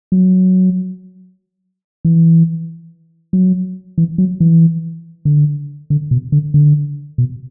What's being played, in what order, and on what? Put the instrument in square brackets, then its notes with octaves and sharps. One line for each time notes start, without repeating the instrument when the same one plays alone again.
[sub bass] F#3
E3
F#3
E3
F#3
E3
D3
D3
B2
D3
D3
B2